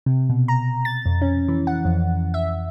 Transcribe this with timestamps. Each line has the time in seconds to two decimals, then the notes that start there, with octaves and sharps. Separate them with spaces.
0.06 C3
0.30 B2
0.48 A#5
0.85 A6
1.06 F2
1.21 C#4
1.48 E3
1.67 F#5
1.85 F2
2.34 E5